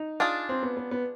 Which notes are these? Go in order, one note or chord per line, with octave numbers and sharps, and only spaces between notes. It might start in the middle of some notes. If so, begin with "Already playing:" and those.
Already playing: D#4
D4 F4 G#4
C4
B3
B3
B3